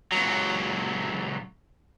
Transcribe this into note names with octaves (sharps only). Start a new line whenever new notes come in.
C#2 F#3